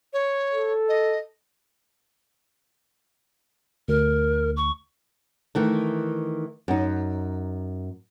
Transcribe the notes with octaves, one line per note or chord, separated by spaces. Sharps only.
C#5
A4
D#5
D2 A#4
C#6
D#3 E3 A3
F#2 D#4